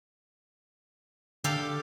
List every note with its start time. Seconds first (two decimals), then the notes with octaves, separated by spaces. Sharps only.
1.44 D3 G4 A4 F5